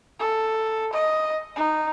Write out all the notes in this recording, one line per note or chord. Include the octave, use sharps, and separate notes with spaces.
A4
D#5
D#4